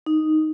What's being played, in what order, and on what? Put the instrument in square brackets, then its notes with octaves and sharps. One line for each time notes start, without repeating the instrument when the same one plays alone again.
[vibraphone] D#4